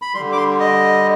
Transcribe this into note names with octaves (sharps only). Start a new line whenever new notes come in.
B5
D3 G3 C6
D6
C6
D#5